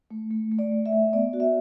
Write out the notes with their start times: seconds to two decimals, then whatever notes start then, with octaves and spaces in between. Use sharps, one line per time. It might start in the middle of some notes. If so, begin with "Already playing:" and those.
0.11 A3
0.31 A3
0.51 A3
0.59 D5
0.72 A3
0.86 E5
0.93 A3
1.13 B3 D5
1.33 F#4
1.40 E5